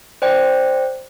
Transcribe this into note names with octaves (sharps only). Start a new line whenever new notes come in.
C5 D5 G5